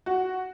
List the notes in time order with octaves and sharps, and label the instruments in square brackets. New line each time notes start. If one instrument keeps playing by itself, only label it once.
[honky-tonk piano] F#4